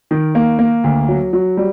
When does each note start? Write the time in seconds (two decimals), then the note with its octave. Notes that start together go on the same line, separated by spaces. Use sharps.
0.11 D#3
0.35 A#3
0.59 A#3
0.84 D2
1.08 F#3
1.33 F#3
1.57 G3